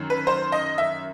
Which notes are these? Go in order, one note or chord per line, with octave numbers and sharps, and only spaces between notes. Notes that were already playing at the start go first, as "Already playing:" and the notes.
Already playing: F#2 D#3
B4
C5
D#5
E5